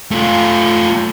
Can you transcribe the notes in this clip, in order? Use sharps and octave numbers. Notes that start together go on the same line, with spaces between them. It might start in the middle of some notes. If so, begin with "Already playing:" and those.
A3 F4